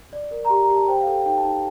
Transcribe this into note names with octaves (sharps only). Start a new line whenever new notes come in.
D5
A#4
A#5
G4 C6
A#5
G4
A5
C5 G5
F5
A4
G5
D#4 G5
A5
D#4